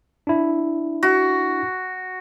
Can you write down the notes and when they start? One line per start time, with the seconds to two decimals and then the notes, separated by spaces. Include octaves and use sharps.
0.27 D4 E4
1.03 F#4